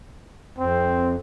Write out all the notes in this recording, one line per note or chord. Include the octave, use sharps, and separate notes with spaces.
F2 C4